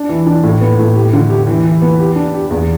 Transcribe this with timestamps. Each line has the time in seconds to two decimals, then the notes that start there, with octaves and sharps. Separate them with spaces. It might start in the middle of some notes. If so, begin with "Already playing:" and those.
Already playing: D4
0.09 E3
0.26 D4
0.44 A2
0.61 B3
0.79 A2
0.95 G4
1.13 D3
1.30 G4
1.47 E3
1.65 E3
1.82 B3
1.99 G4
2.16 D4
2.34 G4
2.51 E2